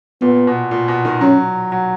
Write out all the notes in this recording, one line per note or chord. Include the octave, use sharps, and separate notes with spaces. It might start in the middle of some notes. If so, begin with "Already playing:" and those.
A#2 B3
B2
A#2
B2
D#3
F#3 C#4
F#3